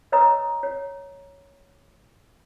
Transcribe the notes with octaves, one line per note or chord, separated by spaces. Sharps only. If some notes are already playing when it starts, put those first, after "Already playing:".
B4 C#5 D#5 A#5 D#6 E6
C#5